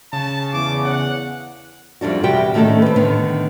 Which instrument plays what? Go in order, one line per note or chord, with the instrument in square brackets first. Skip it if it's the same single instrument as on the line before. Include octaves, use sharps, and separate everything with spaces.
[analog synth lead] C#3 [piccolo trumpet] A5
[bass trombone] E2 [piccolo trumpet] D6
[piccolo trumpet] F#5
[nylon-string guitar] F2 G3 D4 F#4
E2 C3 G3 F#4 G4 G5
A2 D#3 A3 C#4 D4 A4
C4 B4
A2 D3 D#3 B3